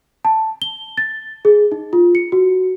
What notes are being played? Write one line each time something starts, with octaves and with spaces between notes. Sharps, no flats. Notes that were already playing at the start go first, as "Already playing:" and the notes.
A5
G7
A6
G#4
D#4
F4
C#7
F#4